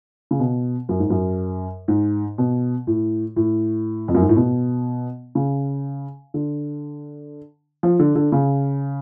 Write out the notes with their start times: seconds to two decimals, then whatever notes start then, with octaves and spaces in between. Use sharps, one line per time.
0.31 C#3
0.39 B2
0.89 F#2
1.00 G#2
1.10 F#2
1.88 G#2
2.38 B2
2.87 A2
3.36 A2
4.08 F2
4.14 F#2
4.22 G#2
4.29 A2
4.36 B2
5.35 C#3
6.34 D3
7.83 F3
7.99 D3
8.15 D3
8.32 C#3